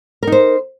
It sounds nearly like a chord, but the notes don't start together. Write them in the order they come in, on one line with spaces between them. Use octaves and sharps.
A#4 D#4 C5